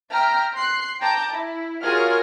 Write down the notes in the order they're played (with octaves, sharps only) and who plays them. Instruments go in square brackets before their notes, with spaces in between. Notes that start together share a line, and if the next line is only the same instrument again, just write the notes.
[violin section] E5 G5 A#5 F6
C6 F#6 C7
G5 A5 A#5 D6 G6
E4
F4 F#4 G#4 A#4 C#5 F6